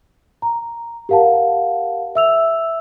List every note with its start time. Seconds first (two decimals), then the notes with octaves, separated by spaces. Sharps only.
0.42 A#5
1.09 G4 A#4 F5 F#5 A5
2.15 E5 E6 F7